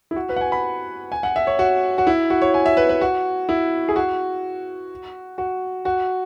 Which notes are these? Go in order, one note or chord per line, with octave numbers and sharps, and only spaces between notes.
E4
F#4
B4
F#5
G#5
B5
G#5
F#5
E5
C#5
F#4
F#4
E4
F#4
C#5
G#5
E5
B4
B4
F#4
E4
G#4
F#4
F#4
F#4